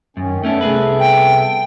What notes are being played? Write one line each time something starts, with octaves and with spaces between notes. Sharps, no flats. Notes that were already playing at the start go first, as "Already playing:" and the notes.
F#2 D#3 C#4
A3 B3 C#4 D4 A4 E5
C2 G#4 B4
G5